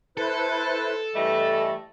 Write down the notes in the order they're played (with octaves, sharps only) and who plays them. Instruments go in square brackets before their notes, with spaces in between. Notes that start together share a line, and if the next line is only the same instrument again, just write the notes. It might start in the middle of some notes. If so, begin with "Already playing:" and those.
[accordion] E4 B4 C5 [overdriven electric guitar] A4
[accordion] G2 D#5 [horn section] E3 G3 A3